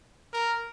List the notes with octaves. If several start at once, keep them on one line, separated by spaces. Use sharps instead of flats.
A#4